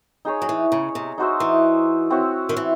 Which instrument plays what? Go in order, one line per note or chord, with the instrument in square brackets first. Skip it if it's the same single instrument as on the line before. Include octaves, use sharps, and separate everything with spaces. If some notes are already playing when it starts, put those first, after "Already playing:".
[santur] D#4 G#4 C#5
[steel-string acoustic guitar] F#3
E3
C#3
C3
[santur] D#4 F#4 C5 E5
[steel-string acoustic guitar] E3
[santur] C4 F#4 C#5 E5
[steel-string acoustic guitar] D#3
E3